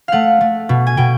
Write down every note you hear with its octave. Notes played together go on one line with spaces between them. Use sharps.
A3 F5 F#5
A3
B2
G#5
B2 G5